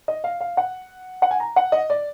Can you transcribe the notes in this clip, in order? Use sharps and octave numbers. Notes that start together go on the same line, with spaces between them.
D#5
F5
F5
F#5
F#5
G#5
A#5
F#5
D#5
D5